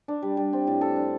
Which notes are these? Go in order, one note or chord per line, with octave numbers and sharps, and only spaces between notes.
D4
G3
G3
C4
A2
A4
D4